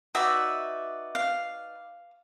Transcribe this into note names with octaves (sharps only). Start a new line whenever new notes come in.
D#4 F#4 B4 D5 E5
F5